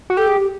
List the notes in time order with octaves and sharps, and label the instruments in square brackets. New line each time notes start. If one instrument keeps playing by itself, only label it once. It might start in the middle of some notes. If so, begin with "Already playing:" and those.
[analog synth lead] F#4
[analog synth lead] G4 [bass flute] A4
[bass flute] G#4
G4